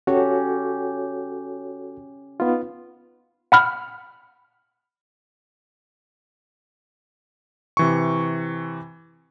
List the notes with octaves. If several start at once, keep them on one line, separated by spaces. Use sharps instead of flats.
C#4 F#4 G4 A4 C#5
B3 D#4 F4
F#5 B5 F6
C3 E3 C#6